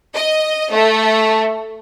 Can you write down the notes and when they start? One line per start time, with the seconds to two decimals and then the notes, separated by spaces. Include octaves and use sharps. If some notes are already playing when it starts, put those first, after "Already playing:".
0.16 D#5
0.71 A3